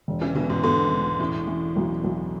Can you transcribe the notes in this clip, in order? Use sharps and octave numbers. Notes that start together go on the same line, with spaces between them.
E1
C#3 E3
E1 B2 D3
G#2 B2
G#2 B2 D3
E1
A2 C#3 E3
E3
B1
B1